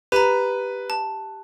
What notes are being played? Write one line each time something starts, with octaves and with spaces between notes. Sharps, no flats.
G4 B4 A#5
A5